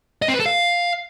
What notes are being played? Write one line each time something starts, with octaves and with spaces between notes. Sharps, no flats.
D#5
C4
B4
A4
F5